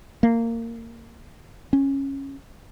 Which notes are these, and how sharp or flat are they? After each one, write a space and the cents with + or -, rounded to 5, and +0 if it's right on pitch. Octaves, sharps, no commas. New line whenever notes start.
A#3 -20
C#4 -15